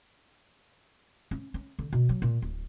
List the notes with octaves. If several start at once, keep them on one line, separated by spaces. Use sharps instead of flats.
C#4
C#4
D3
B2
F#3
A#2
D1